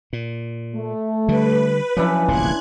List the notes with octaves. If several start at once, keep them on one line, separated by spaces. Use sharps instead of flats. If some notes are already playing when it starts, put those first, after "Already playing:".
A#2
A3
D3 G3 B4
C#3 F3 F#3 D4 E4
D1 A#1 C3 A#3 C6 F#6 G#6